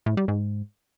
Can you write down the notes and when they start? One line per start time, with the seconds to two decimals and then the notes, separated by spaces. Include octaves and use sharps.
0.06 A2
0.17 G3
0.28 G#2